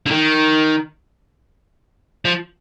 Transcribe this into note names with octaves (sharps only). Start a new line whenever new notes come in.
D3
D#3
F3